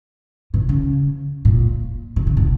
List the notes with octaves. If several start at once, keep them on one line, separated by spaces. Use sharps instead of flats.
B2
C#3
A#2
B2
C#3
B2